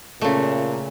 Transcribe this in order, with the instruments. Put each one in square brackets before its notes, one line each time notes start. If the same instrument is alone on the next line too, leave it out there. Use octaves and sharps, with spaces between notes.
[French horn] A#2 [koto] C#3 A3